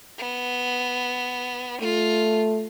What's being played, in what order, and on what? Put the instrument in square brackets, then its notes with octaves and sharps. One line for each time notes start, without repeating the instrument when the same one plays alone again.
[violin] B3
[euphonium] A3 [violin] F4